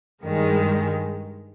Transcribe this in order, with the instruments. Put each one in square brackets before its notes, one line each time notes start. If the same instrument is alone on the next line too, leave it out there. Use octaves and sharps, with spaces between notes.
[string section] G2 D#3 G#3